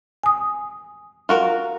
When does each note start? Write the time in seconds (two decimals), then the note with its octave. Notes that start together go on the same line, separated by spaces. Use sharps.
0.23 G#5 D#6
1.29 F4 F#4 A#4